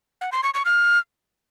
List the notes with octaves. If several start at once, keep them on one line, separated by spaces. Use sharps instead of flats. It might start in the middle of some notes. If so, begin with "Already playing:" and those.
F#5
C6
C#6
C#6
F6